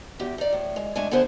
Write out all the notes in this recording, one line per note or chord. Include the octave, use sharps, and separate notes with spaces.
E2 G4
D#4 D5
A2
G#3
G#3 A3 D4 G#5
D3 B3 E4 G#4 C5